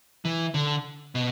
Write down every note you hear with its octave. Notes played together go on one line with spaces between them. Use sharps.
E3
D3
B2